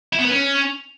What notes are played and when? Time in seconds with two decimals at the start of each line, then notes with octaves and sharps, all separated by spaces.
0.13 E4
0.19 B3
0.25 B4
0.31 C#4